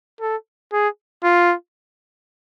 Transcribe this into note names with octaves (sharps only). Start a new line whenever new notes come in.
A4
G#4
F4